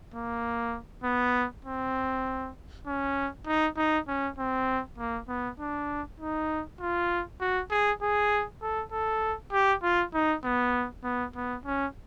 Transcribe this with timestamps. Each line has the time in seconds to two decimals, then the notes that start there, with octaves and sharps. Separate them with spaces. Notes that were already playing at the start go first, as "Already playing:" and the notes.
0.14 A#3
1.04 B3
1.65 C4
2.87 C#4
3.46 D#4
3.77 D#4
4.08 C#4
4.38 C4
4.98 A#3
5.28 B3
5.60 D4
6.20 D#4
6.80 F4
7.41 F#4
7.71 G#4
8.02 G#4
8.62 A4
8.92 A4
9.53 G4
9.83 F4
10.14 D#4
10.44 B3
11.04 B3
11.35 B3
11.65 C#4